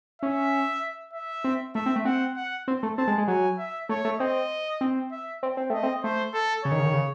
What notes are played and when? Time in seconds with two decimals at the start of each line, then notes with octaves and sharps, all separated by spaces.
0.22 C#4 E5
1.13 E5
1.44 C4
1.75 A3 E5
1.86 C4
1.96 A3
2.05 C4 F#5
2.36 F#5
2.68 C4
2.83 A3
2.98 C4 A5
3.07 G#3
3.18 G#3
3.28 F#3 G#5
3.58 E5
3.89 A3 C#5
4.05 A3
4.19 C4 D#5
4.81 C4
5.12 E5
5.43 C4
5.57 C4
5.70 A3 D#5
5.83 C4
6.03 A3 C5
6.34 A4
6.64 C#3 C#5
6.71 D#3
6.79 C#3
6.86 D#3
6.93 C#3